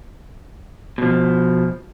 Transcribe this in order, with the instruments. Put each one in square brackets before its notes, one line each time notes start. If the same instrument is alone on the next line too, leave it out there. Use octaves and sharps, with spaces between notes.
[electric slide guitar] B2 F3